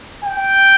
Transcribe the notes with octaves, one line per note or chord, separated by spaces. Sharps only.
G5